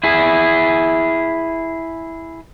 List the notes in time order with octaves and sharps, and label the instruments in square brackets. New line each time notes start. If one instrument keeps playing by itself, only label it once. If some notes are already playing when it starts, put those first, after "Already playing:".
[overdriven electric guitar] E4 G#4